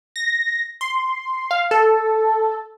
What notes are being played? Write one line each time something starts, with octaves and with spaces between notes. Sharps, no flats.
A#6
C6
F5
A4